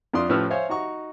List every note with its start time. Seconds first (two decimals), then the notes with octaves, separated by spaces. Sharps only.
0.13 F2 D4 F4 D5 C6 D#6
0.29 A2 F3 C#4 B4 E6 F6
0.50 C5 C#5 E5 F5 G#5
0.69 D#4 F#4 A#5 C#6